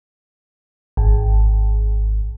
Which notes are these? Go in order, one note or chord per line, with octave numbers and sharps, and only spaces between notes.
G#1